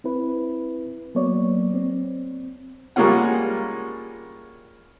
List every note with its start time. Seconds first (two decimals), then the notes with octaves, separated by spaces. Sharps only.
0.04 C4 E4 B4
1.15 F#3 A#3 B3 C#5 D5
1.74 C4
2.96 G3 G#3 A#3 C#4 F4 F#5